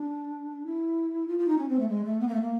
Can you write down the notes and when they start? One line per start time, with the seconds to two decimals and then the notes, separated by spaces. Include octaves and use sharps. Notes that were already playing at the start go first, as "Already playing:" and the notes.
Already playing: D4
0.66 E4
1.28 F4
1.38 F4
1.48 D#4
1.58 C#4
1.69 C4
1.79 A3
1.89 G#3
2.05 A3
2.20 B3
2.28 A#3
2.34 A3
2.41 A#3